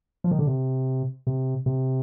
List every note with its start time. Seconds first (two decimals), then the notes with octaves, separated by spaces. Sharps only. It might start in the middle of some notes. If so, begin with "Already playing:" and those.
0.24 F3
0.31 D#3
0.39 D3
0.47 C3
1.27 C3
1.66 C3